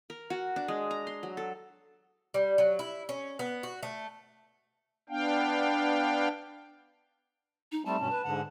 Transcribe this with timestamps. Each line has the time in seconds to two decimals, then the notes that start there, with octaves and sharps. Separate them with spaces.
0.10 A#4
0.30 F#4
0.56 D4
0.68 G#3
0.91 A#5
1.07 C6
1.23 F#3
1.37 A4
2.34 G3
2.58 F#3
2.79 E4
3.09 C#4
3.39 B3
3.63 F#4
3.83 A3
5.09 B3 D4 F5 G5
7.72 D#4
7.85 G3 A3 C4 A5
7.99 G2 B2 C#4
8.11 B4
8.25 G#2 D3 F#5